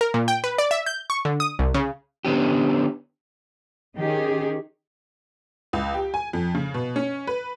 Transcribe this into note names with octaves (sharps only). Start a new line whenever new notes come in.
A#4
A#2
G5
B4
D5
E5
G6
C#6
D3
D#6
C2
C#3
D3 B3 C#4 G4
D#3 C#4 D#4 G4 G#4
C#2
G4
G#5
F2
C#3
B2
C#4
B4